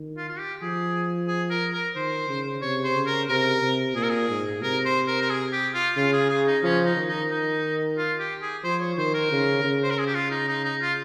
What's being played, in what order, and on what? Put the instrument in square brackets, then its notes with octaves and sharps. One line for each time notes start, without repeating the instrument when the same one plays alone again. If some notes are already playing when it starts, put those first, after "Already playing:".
Already playing: [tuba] D#3
[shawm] F4
F4
G4
[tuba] F3 [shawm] G#4
[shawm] G#4
A#4
A#4
[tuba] D#3 [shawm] C5
[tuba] C#3
[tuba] C3 [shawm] C#5
[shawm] C5
[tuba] C#3
[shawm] A#4
[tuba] C3 [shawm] A#4
[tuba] C3
[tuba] A#2 [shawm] G#4
[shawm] A#4
G#4
[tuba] G#2
[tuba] C3 [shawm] A#4
[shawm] C5
A#4
A#4
G#4
G4
F4
[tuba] C#3 [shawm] F4
[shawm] G#4
G#4
D#4
[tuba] F3 [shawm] C#4
[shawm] D#4
[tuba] D#3
[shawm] D#4
D#4
F4
G4
G#4
[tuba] F3 [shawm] C5
[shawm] C#5
[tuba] D#3 [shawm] C5
[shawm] A#4
[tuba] C#3
C#3
[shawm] C5
A#4
G#4
G4
F4
D#4
D#4
D#4
F4